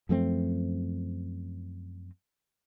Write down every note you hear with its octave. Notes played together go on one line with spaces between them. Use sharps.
F#2 F3 A3 C4